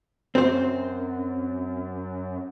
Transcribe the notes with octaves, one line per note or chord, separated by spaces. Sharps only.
F#2 C4 C5